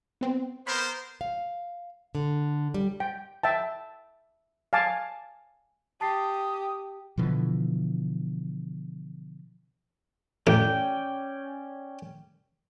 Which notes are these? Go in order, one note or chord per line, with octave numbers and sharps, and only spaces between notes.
B3 C4
B3 A#4 C5 B5
F5
D3
G3
G5
E5 G5 A5
F5 G#5 A5 D6
G4 A5 D#6 A6 C7
B2 D3 E3 F3
A1 C#4 D5 G5